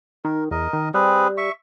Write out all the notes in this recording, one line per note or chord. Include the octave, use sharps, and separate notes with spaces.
D#3 A#4
E2 A#4 D#5
D#3
G3 C4 G#4 B4
E5 C#6